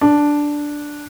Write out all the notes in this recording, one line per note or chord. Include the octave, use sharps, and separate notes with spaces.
D4